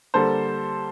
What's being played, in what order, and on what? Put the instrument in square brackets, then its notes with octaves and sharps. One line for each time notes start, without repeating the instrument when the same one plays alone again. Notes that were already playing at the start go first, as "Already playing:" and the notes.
[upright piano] D3 G3 A#3 A4 C5